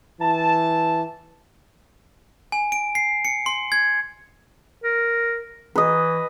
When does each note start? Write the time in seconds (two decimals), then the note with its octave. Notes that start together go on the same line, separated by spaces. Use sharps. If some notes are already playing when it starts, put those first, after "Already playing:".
0.21 E3 A5
2.52 G#5
2.72 D7
2.95 C7
3.25 C#7
3.46 C6
3.72 G#6
4.84 A#4
5.76 E3 B4 D#5